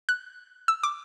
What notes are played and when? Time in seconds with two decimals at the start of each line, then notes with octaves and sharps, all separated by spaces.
0.09 F#6
0.68 E6
0.83 D6